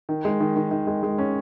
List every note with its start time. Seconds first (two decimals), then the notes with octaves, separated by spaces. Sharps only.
0.09 D#3
0.25 G#3
0.40 D#3
0.56 D#3
0.71 D#3
0.87 G#3
1.03 G#3
1.18 C#4